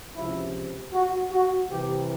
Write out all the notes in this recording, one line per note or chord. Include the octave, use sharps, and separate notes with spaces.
C#2 C3 F3 E4
F#4
F#4
C2 C3 E3 G4